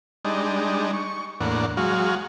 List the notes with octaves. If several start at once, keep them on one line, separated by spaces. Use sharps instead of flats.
G3 G#3 D4 D#4
C#6
E2 A2 A#3 D4 F#5
F#3 G#3 F#4 F5